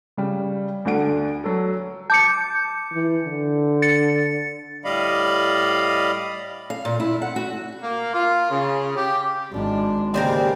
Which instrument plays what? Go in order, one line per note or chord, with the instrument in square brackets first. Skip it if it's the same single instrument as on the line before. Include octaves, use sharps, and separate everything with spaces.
[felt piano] C#3 G3
D2 D3 D4 F#5 D7
F#3 A4
[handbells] A5 D6 [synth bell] G6 C#7
[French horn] E3
D3
[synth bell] A6 C#7
[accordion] A2 G3 D5 D#5 F5 B5
[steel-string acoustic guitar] F5
A#2
E4
F#5
F#4
[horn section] A#3
F4
C#3
G4
[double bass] G#1 D4 [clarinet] G#3
[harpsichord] D#2 C5 [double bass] C#3 [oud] C4 G4 A#4 [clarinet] D5